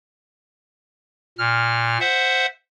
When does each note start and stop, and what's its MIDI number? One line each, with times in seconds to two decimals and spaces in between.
1.38 1.98 46
1.38 1.98 89
2.00 2.46 72
2.00 2.46 76
2.00 2.46 78